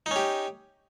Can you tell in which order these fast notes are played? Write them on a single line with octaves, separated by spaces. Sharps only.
D#4 C#4 G4